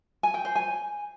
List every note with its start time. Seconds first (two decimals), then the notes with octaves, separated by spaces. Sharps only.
0.23 G#5
0.34 G5
0.45 C5
0.56 G#5